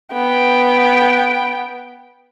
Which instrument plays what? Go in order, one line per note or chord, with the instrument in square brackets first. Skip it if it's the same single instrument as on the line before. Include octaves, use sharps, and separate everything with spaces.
[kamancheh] B3 G5